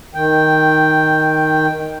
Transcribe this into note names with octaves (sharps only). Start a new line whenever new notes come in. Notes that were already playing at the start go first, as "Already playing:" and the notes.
D#3 G5